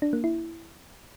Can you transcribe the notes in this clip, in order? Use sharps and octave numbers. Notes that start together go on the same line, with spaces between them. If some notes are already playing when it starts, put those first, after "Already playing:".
D4
A#3
E4